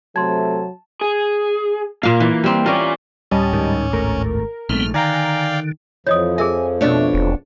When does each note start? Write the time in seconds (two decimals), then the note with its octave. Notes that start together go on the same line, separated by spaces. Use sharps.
0.16 C3 F#3 A3 A5 C6 G#6
1.01 G#4
2.03 A#2 A#3 F5
2.20 E3
2.44 G3 C4
2.66 C#4 F4 A#4 D5
3.31 D2 A2 G3 C#4 D#5 A5
3.53 G#2 D#3
3.93 G#1 A3 A#4
4.69 A#1 G#2 G3 A3 B3 C4 F6
4.94 D3 D#3 D5 F5 G5 G#5 A#5
6.07 F2 E3 F3 C#5 D#5 D#6
6.38 G#4 A#4 E5 G#5
6.81 B2 A3 D4 C#5
7.13 E1